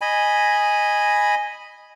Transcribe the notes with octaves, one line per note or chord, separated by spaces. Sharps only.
D#5 G#5 B5